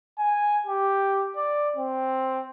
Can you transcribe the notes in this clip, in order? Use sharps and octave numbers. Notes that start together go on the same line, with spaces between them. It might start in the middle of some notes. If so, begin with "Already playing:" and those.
G#5
G4
D5
C4